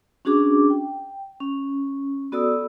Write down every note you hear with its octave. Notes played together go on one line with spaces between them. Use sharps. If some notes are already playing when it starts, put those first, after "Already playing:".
C#4 D4 F#4 G#4 D6
G5
C#4
B3 F#4 A4 D5 D#6 E6